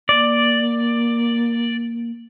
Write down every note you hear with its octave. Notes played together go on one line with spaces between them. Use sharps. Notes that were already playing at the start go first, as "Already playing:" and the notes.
A#3 D5